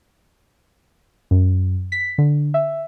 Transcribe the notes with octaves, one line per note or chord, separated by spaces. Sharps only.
F#2
B6
D3
E5